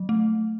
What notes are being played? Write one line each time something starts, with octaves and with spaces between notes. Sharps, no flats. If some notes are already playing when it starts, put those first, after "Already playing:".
Already playing: F#3
A3